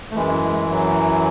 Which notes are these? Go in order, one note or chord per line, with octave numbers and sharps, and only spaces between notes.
A3
F#2 E3 G#3
G#3
F#3